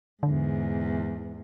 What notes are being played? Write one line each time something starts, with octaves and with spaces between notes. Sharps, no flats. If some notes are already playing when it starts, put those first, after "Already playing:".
E2 G#2 D3